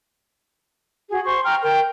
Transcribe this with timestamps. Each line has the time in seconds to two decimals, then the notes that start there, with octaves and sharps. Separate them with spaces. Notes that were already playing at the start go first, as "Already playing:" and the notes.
1.10 F#4 G#4
1.26 C5 C6 C#6
1.43 G5 A#5 F6
1.61 A#4 G5